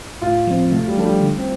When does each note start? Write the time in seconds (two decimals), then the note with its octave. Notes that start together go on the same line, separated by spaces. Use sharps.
0.22 A2 F4
0.47 F3 C4
0.72 C3 A3
0.88 G3
0.96 F3 D4 A4
1.05 G3
1.20 D3
1.38 C4